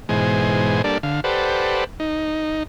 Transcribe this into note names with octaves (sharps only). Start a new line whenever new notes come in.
G#2 B2 E3 G#3 C5 G#5
G3 A#3 D4 A4 D5
D3 F5
G4 A4 B4 C5 D5 F#5
D#4